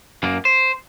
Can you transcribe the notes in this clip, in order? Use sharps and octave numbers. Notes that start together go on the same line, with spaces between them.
F#2 A#3
C5